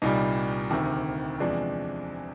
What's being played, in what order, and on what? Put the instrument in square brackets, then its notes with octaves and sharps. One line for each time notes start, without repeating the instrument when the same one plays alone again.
[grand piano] C2 A#2 G3 D#4
D2 C3 D#3
E2 C3 F3 G#3 D4